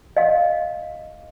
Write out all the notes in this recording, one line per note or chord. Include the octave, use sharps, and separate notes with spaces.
D#5 F5